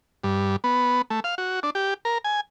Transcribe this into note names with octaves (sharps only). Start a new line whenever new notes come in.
G2
B3
A3
F5
F#4
D4
G4
A#4
G#5